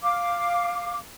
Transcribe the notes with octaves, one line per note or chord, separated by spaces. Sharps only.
F5 D6